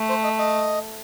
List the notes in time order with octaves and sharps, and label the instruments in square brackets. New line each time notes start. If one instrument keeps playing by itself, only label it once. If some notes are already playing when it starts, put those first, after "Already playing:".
Already playing: [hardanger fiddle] A3
[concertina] C5
D#5
D#5